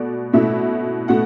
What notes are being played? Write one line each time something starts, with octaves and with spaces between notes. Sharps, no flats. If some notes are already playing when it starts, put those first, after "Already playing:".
Already playing: B2 A3 D5
B2 A3 E4 E5
B2 A3 F#5